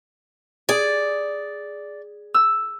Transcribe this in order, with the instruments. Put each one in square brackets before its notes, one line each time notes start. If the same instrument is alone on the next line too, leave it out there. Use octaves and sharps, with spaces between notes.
[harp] G#4 [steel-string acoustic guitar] D5
[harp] E6